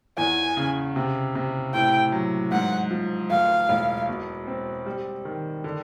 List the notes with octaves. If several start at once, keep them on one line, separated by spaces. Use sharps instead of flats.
E2 G#5
C#3
C3
C3
A2 G5
F#3
G#2 F#5
F3
D2 F5
E1
B2
C4
G3
D#3
D3